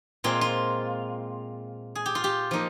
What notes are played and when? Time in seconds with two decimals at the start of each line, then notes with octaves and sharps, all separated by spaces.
0.24 A#2 G#3 C4 F4
0.41 F4
1.95 G#4
2.06 G4
2.15 F4
2.24 G4
2.51 F3 A#3 D#4